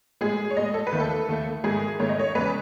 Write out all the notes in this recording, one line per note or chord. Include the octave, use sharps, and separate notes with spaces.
A2 G#3 G#4
C#5
A2 G#3 D#5
A4
B4
D#2 D#3 A3
A4
D#2 D#3 A3
G#2 D#3 A3 G#4
G#2 D#3 A3 C#5
D#5
C#5
E2 C#3 G#3 B4